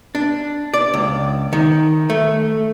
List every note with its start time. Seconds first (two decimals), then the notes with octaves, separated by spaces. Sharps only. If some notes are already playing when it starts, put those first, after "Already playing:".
0.15 D4
0.74 D5
0.94 C#2
1.53 D#3
2.10 A3